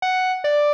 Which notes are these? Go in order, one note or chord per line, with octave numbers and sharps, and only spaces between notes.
F#5
D5